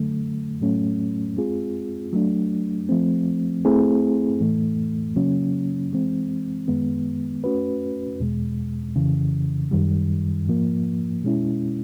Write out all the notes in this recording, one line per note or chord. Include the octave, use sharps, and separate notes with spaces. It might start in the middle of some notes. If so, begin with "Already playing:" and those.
Already playing: D3 F#3 A3
A2 F#3 A3 C#4
G#3 C4 F4 G#4
F#3 A3 D4
F3 A3 C4
A3 C4 E4 G#4
A2 E3 A3
C#3 F#3 A#3 C#4
E3 G#3 C4
F#2 D#3 G#3 B3
A3 C#4 F#4 B4
E2 B2 G#3
F2 C#3 E3
F#2 D#3 G3
G#2 F3 A#3
B2 G#3 C#4 E4